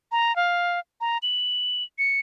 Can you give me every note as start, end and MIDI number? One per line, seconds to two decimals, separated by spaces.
0.12 0.35 82
0.36 0.79 77
1.01 1.18 82
1.23 1.83 102
1.99 2.20 97